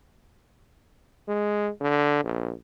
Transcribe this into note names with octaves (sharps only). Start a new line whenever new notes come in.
G#3
D3
A#1